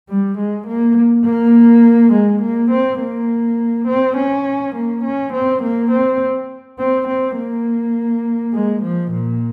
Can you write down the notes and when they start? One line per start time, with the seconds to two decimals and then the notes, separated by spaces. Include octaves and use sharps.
0.09 G3
0.38 G#3
0.67 A#3
1.25 A#3
2.12 G#3
2.42 A#3
2.71 C4
3.00 A#3
3.87 C4
4.17 C#4
4.75 A#3
5.04 C#4
5.33 C4
5.62 A#3
5.91 C4
6.79 C4
7.08 C4
7.37 A#3
8.53 G#3
8.82 F3
9.11 A#2